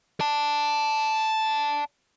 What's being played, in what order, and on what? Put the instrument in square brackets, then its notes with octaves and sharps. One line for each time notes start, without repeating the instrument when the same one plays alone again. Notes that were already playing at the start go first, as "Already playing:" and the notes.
[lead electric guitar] D5 A5